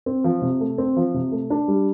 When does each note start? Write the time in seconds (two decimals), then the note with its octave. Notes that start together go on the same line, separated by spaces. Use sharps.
0.06 C4
0.24 F3
0.42 C3
0.60 A3
0.78 C4
0.96 F3
1.14 C3
1.32 A3
1.50 D4
1.68 G3